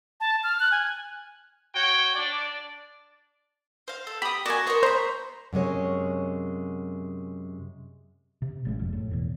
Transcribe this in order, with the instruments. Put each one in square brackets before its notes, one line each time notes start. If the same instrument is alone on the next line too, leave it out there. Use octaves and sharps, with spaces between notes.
[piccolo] A5
F6
F#6
G#5
[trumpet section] F#4 C#5 G5
D4 D5
[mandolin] C5 F5
A4
[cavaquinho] G4 [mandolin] G5 D#6 [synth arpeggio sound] B5
[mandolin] F#4 A#4 [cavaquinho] D5 G#5
[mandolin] A#4 C#5 [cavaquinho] C5 D#5
[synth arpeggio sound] C5 [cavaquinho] A#5 B5
[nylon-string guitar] F#2 C3 G#3 C#5
[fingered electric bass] C3
A1 G3 G#3
F#1 F2
A2
E2 B2